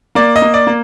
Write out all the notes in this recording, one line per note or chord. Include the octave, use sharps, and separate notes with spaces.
A#3 D5
D#5
A#3
D5
A#3